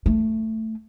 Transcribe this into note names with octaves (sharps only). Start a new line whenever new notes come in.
A3